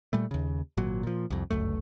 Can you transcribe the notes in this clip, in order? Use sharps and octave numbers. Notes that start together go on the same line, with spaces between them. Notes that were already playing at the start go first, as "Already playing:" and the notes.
A#2 G3 A3
D#2 C#3
G#1 A#2 F#3
A#2 F3
C2 F2
G1 C#2 F#2 A3